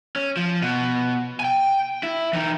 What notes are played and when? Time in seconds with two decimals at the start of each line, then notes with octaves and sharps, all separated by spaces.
0.16 C#4
0.37 F3
0.62 B2
1.40 G5 G#5
2.03 E4
2.33 E3 D#4